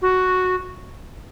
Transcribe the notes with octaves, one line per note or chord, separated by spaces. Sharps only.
F#4